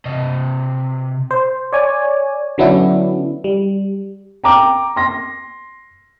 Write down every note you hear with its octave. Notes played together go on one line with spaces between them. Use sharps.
C3 D#5
C5
C#5 D5 G#5
D3 F#3 B3 C#4 D4 E4
G3
G5 A#5 D6
C6 A#6